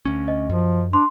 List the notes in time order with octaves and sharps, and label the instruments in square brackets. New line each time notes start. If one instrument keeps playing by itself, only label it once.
[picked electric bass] D2 C#4
[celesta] D#5
[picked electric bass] F#2 [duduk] F3
[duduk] D4 [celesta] C6